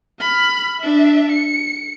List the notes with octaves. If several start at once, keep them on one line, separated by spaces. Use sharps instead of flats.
B5 F6
D4 E5
C#7